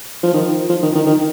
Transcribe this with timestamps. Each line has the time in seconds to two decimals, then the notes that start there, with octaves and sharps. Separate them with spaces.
0.23 F3
0.33 D#3
0.69 F3
0.83 D#3
0.95 D#3
1.06 D#3